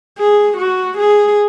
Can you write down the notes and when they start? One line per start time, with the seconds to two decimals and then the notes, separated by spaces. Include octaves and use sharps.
0.18 G#4
0.57 F#4
0.98 G#4